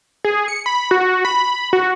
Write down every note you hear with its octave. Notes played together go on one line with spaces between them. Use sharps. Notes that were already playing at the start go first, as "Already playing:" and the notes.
G#4
C#7
B5
F#4
B5
F#4